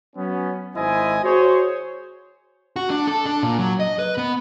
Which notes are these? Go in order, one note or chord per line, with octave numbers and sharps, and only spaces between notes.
F#3 B3 C#4
G#1 E4 C5 D#5 G#5
F#4 G#4 C5 C#5
F#4
D4
A4
D4
A#2
F#3
D#5
B4
B3